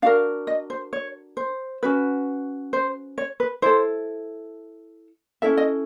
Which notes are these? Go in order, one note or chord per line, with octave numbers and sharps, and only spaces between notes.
D4 F#4 A#4 F5
D#5
C5
C#5
C5
C#4 F#4 B4
C5
C#5
B4
E4 A4 C5
C#4 E4 A4 E5
D#5